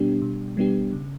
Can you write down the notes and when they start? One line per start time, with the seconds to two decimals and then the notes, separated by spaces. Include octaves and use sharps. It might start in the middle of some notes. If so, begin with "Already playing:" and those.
Already playing: B2 G3 B3 D4 G4
0.22 B2
0.57 G3 B3 D4 G4
0.93 C#3